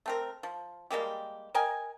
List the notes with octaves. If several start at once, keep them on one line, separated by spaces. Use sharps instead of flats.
A3 C4 A#4
F3
G3 G#3 A#3 G4
A#4 D#5 G5 G#5